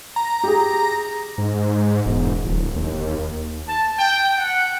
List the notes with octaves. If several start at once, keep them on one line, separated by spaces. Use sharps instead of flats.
A#5
G4 G#4
G#2
E1
D1
D#2
A5
G5
F#5